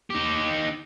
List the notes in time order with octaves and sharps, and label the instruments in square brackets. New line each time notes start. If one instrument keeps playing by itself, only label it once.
[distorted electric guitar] D#4 G4